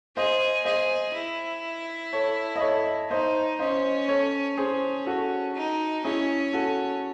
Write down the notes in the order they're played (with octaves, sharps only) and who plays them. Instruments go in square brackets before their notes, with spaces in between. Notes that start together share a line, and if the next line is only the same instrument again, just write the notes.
[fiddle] G#4 [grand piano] C5 D#5
[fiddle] G#4 [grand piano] C5 D#5
[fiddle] E4
[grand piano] A4 C#5
D#5
A4 C#5
[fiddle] D#4 [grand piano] C5 D#5
[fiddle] C#4 [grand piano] C5 D#5
[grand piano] A4 C#5
[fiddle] C#4 [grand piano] G#4 C5
[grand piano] F#4 A4
[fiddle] D#4
[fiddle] C#4 [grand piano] E4 G#4
[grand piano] F#4 A4